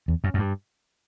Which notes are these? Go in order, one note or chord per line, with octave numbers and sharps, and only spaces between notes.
E2
F#2
F#2
G2